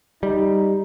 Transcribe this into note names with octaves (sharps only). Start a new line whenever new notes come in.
G3 D#4